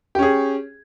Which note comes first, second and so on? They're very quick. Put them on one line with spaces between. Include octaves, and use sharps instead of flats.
G4 C#4 G#4